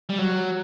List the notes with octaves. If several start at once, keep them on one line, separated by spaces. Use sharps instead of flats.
G3
F#3